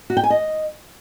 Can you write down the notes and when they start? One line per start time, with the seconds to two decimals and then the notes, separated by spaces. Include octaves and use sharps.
0.10 F#4
0.17 G5
0.23 G#5
0.30 D#5